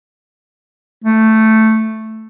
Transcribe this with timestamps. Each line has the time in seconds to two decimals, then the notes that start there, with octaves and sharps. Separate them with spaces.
1.04 A3